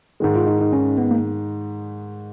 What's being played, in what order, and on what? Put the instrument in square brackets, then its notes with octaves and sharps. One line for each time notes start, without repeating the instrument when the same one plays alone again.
[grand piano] G#2 D#3 G#3
[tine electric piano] F4
D#4
D#4
C#4
B3
A#3